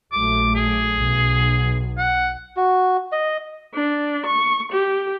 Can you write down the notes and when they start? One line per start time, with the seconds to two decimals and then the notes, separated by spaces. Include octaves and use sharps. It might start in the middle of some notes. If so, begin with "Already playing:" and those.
0.12 A#1 F#3 A3 D6
0.55 G#4
0.97 B1
1.98 F#5
2.56 F#4
3.12 D#5
3.74 D4
4.26 C#6
4.72 G4